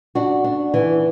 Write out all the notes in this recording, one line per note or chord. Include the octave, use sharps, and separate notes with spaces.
D4 F#4
D4
E3